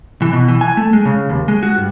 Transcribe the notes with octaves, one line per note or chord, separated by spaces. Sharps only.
E3
B2
E3
G#5
A3
G#3
C#3
D#2
G#3
F#4
G2